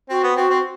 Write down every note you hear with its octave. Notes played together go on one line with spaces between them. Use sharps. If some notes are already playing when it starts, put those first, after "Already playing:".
C4 F#4
B3
C4 F#4
C4